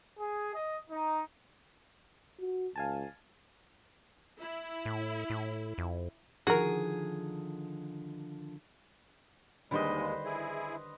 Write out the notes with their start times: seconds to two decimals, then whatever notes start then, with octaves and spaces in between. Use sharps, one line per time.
0.19 G#4
0.53 D#5
0.88 D#4
2.39 F#4
2.76 C#2 F5 G#5 A5
4.41 E4
4.85 A2
5.30 A2
5.78 F2
6.47 D3 D#3 F3 F#4 G#4 A#4
9.71 D#2 D3 D#3 G3 G#3 B4 C5 D#5
10.25 E4 G#4